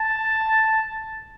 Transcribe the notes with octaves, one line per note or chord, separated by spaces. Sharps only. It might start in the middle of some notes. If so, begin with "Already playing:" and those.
Already playing: A5